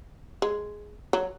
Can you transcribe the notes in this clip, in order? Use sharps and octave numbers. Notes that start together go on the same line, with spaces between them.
G#3
F#3